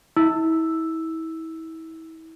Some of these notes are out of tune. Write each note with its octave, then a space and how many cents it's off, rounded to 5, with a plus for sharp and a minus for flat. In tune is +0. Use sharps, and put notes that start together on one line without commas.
E4 -35 E6 +0